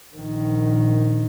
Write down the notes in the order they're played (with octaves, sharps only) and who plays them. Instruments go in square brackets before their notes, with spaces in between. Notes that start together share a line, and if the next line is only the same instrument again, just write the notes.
[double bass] A#1 D#3